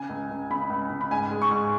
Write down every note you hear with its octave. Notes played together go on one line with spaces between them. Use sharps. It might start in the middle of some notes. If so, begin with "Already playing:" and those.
Already playing: C#3 G#5
C#2
C#2
C#3 B5
C#2
C#3
B5
G#2 G#5
G#3
C#6
G#2